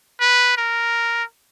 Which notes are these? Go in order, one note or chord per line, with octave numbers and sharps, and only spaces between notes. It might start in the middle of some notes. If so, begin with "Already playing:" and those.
B4
A#4